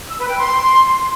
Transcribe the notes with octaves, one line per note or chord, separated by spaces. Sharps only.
E6
B4
G5
C6